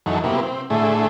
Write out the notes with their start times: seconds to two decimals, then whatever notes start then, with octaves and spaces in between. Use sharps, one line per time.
0.06 F#2 E3 F#3 D#4 A4
0.24 C3 F#3 A#3 B3 E4 G4
0.43 C4
0.70 A2 D3 A3 E4 G#4